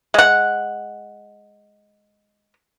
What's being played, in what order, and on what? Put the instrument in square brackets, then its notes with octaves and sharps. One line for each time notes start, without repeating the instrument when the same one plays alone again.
[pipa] G#3 F#5